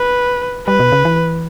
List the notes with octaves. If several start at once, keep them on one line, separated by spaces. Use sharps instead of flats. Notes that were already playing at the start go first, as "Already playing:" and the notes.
Already playing: B4
G3 B4
B2
C#3
E3